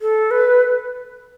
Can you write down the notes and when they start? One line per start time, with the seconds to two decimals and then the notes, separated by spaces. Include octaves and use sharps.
0.01 A4
0.31 B4